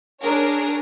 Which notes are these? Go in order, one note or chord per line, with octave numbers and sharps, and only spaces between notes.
D4 G#4 A#4 C#5